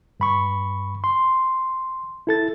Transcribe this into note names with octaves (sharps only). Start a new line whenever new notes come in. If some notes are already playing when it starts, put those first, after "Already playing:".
G2 B5 C#6
C6
E4 A4 A6